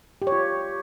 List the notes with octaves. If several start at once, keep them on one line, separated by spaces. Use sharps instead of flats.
G4
C#5
F4